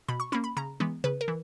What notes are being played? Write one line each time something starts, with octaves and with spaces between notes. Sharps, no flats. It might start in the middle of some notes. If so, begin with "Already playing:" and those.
B2 B5
C#6
A#3 C#4 B5
B5
C#3 A#5
E3 G#3 B3
C#3 B4
A#4
E3